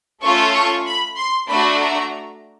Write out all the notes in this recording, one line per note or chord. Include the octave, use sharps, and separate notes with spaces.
A3 C#4 F4 A4 C#6
C#6
B5
C6
A3 D4 F#4 B5
A#5